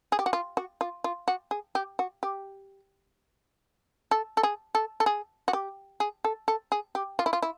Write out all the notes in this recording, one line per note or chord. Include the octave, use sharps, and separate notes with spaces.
G#4
G4
F#4
F4
F#4
F4
F4
F#4
G#4
G4
F#4
G4
A4
A4
G#4
A4
A4
G#4
F#4
G4
G#4
A4
A4
G#4
G4
F4
E4
F4
E4